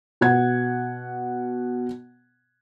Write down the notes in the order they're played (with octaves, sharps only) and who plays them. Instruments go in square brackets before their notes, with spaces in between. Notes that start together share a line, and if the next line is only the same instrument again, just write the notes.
[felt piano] B2 F#5 G#6